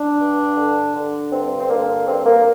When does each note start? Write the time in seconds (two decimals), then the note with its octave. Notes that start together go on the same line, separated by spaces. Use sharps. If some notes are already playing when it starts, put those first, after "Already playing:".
Already playing: D4
0.19 G2
0.56 D3
0.94 D3
1.31 G2 C4
1.58 C4
1.69 D3 A#3
2.06 G2 C4
2.25 A#3